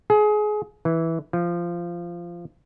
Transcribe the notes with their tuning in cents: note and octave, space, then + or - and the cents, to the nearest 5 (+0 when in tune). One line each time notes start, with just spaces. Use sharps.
G#4 +25
E3 -10
F3 -15